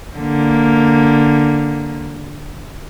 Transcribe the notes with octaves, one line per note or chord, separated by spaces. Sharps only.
D3 A#3